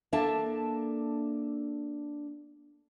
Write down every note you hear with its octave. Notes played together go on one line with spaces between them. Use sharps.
A#3 D4 A4 E5 A5